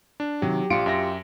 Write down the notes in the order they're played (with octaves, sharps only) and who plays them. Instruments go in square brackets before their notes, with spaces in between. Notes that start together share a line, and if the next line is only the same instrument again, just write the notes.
[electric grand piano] D4
[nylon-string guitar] C3 D#3 [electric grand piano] F#3 [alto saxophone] G4
[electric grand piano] A#1 C#7 D7 [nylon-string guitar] F4
[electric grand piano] F#2 E5 A#6